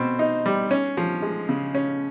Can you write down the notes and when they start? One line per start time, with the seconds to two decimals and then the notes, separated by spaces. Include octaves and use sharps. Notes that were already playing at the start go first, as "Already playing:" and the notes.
Already playing: B2 C4
0.19 D#4
0.46 G3
0.71 C#4
0.97 F3
1.22 G#3
1.49 C#3
1.75 C#4